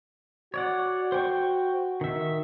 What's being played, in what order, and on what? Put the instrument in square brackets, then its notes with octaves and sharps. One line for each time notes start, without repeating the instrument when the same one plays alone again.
[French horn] F#4 [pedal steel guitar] C#5 D5 F#5
[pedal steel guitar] C5 G5 C#6
D#3 E5